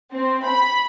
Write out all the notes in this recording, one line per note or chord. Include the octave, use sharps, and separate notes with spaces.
C4
B5